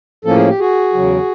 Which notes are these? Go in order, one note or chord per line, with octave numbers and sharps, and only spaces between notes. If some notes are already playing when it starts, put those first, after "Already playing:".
A2 F3 A#3 C#4 A4
G#4
G4
F#4 G#4
E2 C#3 F#3